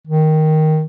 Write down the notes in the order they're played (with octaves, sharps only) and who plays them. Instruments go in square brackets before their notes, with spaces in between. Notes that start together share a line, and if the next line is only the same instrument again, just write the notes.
[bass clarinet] D#3